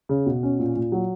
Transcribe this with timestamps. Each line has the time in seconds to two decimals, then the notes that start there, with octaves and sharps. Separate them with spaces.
0.09 C#3
0.26 B2
0.43 C#4
0.59 A#2
0.76 A#2
0.92 F#3